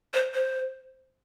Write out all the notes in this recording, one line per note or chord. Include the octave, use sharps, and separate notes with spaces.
C5
C5